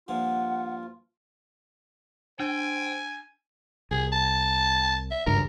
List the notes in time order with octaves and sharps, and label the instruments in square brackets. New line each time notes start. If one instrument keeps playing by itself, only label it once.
[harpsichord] G2 A#2 F3 [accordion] F4 [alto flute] F#5
[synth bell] D4 [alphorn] C5 [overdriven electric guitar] G5 [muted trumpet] G#5
[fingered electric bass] C2 [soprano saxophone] G#4
[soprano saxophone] A5
E5
[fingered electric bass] G#1 C#2 G2 [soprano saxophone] A#4